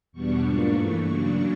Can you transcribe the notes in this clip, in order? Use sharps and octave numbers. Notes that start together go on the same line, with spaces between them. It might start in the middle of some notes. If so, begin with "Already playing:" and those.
E2 B2 G3 B3 D4 C#6
G#2 F3 A#3 D4
G2 E3 A3 C#6
C#3 F#3 A#3 D4